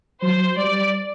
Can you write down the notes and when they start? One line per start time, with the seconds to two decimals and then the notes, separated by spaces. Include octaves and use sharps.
0.23 F#3 C5
0.57 G3 D5